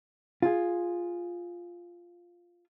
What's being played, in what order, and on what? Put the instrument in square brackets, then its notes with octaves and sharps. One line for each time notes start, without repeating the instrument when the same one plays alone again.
[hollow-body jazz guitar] F4 G#4